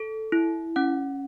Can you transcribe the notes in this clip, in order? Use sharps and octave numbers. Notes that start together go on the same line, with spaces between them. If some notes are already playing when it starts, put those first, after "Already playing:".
Already playing: A4
E4
C#4 F#5